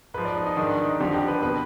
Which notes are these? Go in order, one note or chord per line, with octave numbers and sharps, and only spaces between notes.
G#2 F3 B4
D5
D#4
D#4
G#2 D#3 D4
D#4
F2 D3 F3 G4
G4
B4
B2 B4